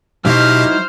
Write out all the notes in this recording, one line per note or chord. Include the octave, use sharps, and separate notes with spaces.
B2 F#3 D#4 E4 G4 C5 F6